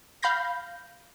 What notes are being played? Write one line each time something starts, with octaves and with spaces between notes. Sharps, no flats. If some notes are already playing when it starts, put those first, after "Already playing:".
F5 B5 G6 A#6